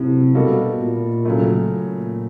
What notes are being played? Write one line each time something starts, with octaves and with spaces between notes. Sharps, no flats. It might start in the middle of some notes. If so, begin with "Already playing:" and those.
Already playing: A2 C3 F#3 E4
B2 G3 A#3 D#4 F#4 A4
A#2
C#3 F#3 A3
A#2